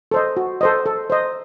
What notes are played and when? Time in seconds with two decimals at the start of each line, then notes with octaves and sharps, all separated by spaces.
0.11 A4 C5 D#5
0.37 F#4
0.61 A4 C5 D#5
0.86 A4
1.10 C5 D#5